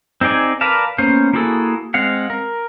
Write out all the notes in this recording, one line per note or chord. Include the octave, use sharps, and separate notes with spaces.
C4 D#4 G#4 D5 G#5
A#4 B4 D5 F5 A5
A#3 B3 C#4 C5
A#3 E4 F#4 G#4 A4
G#3 C4 F5 F#5
A#4